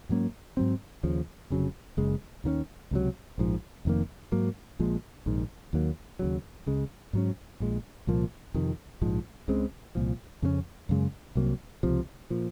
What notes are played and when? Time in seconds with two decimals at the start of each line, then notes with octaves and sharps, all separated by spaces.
0.09 G#2 F#3 A#3 C#4
0.57 G#2 F#3 C4
1.03 D#2 C#3 F3
1.50 F1 F2 C#3 F#3
1.97 F#1 F#2 C#3 G#3
2.44 D#2 D#3 A#3 C#4
2.91 C#2 C3 F#3
3.38 A#1 G#2 F3
3.85 F1 F2 D#3 A#3
4.32 G#2 F#3 A#3
4.79 A#1 A#2 F3 G#3
5.26 A#1 G#2 D#3
5.73 D#2 D#3 F#3 A#3
6.19 D#2 C#3 F#3
6.66 C#2 C#3 G#3
7.13 G#2 F#3 C#4
7.60 A#1 A#2 G#3
8.07 C2 A#2 F3 A#3
8.54 F2 C3 D#3
9.01 A#1 G#2 F3 G#3
9.48 C#2 C#3 G#3 C4
9.95 C2 A#2 F3
10.42 F2 C#3 G#3 C#4
10.89 F#2 C#3 G#3
11.35 C2 C3 F#3 A#3
11.83 C#2 C3 F3
12.30 A#2 F3